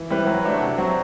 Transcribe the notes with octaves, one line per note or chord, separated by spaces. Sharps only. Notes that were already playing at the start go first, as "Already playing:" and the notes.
Already playing: E3
G3 C4 E4 B4
F#3
A3 D4 F#4
C3
F#3 C4 F#4